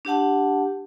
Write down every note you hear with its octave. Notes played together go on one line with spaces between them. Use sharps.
D4 G4 F#5 A5